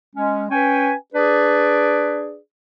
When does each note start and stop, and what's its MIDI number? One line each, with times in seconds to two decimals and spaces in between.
0.16 0.45 56
0.16 0.45 61
0.51 0.94 61
0.51 0.94 71
0.51 0.94 79
0.51 0.94 80
1.14 2.37 62
1.14 2.37 68
1.14 2.37 71
1.14 2.37 74